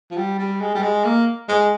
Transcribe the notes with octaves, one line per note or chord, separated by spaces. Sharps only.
F3
G3
G3
G#3
G3
G#3
A#3
G#3